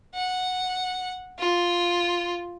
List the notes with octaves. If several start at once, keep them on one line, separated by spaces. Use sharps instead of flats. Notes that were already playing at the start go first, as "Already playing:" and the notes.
F#5
F4